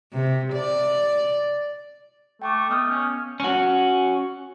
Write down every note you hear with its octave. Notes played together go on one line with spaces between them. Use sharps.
C3
D5
A3 G5 C#6 D6
B3 D#5 F6 G6
C#4
C#4 F#4